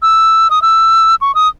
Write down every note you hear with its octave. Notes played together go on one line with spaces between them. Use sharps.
E6
D#6
E6
C#6
D#6